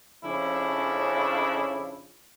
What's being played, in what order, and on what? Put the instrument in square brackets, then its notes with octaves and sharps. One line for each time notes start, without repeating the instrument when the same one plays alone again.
[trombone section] F2 C#3 F3 C#4 D4 E4